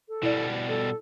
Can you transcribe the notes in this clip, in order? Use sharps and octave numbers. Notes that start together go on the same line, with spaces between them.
A4
B2 G3 E4 D5
A4